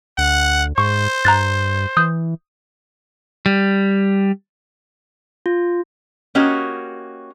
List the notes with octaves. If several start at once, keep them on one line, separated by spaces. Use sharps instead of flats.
D2 F#5
G#2 C5 C#6
G2 A#5 F#6 A6
E3 D#6 G6
G3
F4
A#3 C#4 F#4 G4 D#5